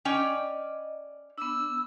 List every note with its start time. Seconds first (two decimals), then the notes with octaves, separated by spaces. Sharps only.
0.05 C#4 D5 D#5 G5
1.38 B3 D4 E6